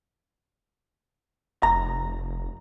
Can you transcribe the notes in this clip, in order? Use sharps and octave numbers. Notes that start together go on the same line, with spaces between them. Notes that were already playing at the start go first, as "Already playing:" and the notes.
F1 A#5